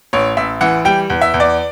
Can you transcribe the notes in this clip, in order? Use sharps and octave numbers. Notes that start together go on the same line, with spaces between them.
A1 C#5
A1 E5
E3 F#5
G3 G5
E2
E5
E2
D5